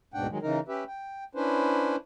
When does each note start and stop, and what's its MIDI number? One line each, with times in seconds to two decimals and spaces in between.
0.14 0.27 38
0.14 0.27 44
0.14 0.27 47
0.14 0.27 62
0.14 0.27 78
0.14 0.27 79
0.30 0.38 51
0.30 0.38 54
0.30 0.38 56
0.42 0.59 49
0.42 0.59 52
0.42 0.59 63
0.42 0.59 70
0.68 0.84 61
0.68 0.84 67
0.68 0.84 71
0.68 0.84 76
0.87 1.24 79
1.35 1.96 61
1.35 1.96 62
1.35 1.96 64
1.35 1.96 71
1.35 1.96 72